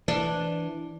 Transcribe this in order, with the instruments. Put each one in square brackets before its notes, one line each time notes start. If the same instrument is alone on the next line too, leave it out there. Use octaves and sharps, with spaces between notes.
[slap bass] E3 [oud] D4